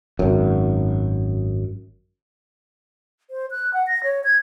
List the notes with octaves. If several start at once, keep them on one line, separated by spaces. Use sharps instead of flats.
G#1 F#2
C5
F#6
F#5
A#6
C#5
G#6